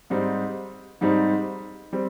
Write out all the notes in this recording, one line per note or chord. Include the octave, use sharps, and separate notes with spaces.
G#2 G3 C4 D#4
G#2 G3 C4 D#4
G3 C4